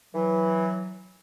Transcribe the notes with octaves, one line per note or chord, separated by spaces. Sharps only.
E3 F#3